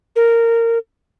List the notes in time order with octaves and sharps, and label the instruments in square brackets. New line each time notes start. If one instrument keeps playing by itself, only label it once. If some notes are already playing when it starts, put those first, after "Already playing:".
[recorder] A#4